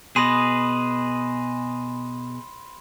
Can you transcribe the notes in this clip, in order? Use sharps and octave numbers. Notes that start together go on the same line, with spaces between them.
B2 G#4 B4 D#5 B5 C6 E7